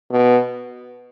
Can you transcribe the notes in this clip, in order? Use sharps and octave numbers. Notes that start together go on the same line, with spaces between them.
B2